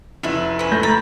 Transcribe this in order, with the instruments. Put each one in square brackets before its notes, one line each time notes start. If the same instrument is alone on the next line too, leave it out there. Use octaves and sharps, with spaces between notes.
[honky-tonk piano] F1 E4 [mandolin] A3 B4
[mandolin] C#4 B4
[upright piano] A3 G6 A#6
[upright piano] A#5 A6 [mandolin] B5